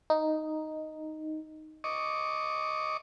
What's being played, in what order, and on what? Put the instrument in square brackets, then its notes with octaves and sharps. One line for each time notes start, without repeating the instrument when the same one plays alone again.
[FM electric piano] D#4
[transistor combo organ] D#5 C#6 D6